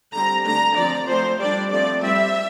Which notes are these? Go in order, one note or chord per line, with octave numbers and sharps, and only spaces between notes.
D3 G3 C4 A#5
D3 A3 D4 A#5
F3 C4 D5
F3 A3 C4 C5
G3 D4 D5
F3 A3 C4 D5
G3 C4 E5